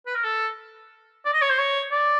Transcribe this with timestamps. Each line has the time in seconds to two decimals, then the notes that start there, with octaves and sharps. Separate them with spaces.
0.07 B4
0.15 A#4
0.24 A4
1.25 D5
1.33 D#5
1.42 C#5
1.50 C5
1.58 C#5
1.91 D5